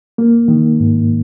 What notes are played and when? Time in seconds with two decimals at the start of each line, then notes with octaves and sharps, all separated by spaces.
0.18 A#3
0.48 D#3
0.80 G#2